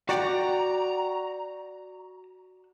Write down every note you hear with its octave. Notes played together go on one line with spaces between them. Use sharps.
F#4 D5 F#5 G5 A#5